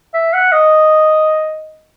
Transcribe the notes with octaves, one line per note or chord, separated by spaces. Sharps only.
E5
F#5
D#5